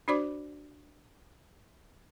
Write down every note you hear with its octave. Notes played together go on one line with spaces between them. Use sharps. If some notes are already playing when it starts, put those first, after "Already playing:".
D4 F#4 C5 D5 B5 D6